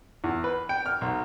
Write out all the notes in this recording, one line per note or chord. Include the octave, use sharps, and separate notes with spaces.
E2
B4
G5
F6
B1